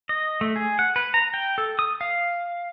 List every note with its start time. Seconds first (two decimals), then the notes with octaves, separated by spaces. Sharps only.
0.09 D#5
0.41 A3
0.56 G#4
0.79 F#5
0.96 B4
1.14 A#5
1.34 G5
1.58 A4
1.79 D#6
2.01 F5